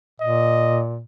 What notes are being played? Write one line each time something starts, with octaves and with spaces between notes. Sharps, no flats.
A#2 D#5